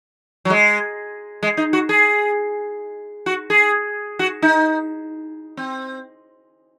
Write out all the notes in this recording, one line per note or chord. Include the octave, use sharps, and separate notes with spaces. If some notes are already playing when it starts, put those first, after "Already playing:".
F#3
G#3
G#3
D#4
F#4
G#4
F#4
G#4
F#4
D#4
C4